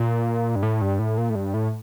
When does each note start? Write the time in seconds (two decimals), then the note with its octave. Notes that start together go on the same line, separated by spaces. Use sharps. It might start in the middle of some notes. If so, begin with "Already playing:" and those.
Already playing: A#2
0.56 G2
0.63 A2
0.81 G2
0.99 A2
1.18 A#2
1.30 A2
1.35 G2
1.54 A2